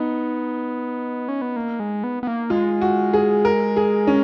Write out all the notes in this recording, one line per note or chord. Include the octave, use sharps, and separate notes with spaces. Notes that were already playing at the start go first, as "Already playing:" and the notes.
Already playing: B3 D#4
C#4
B3
A#3
G#3
B3
B3
A#3
G#3 F4
F#4
G#4
A#4
G#4
C#4